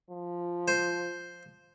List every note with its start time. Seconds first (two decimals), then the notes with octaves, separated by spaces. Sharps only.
0.11 F3
0.68 C5